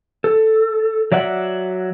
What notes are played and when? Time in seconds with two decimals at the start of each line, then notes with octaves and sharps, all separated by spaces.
0.24 A4
1.12 F#3 D5 E5 F#5